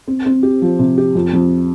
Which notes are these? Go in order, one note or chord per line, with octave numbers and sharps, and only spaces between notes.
C4
C4
G4
F3
C3
G4
F2
F2